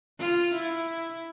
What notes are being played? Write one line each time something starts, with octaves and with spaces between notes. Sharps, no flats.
F4
E4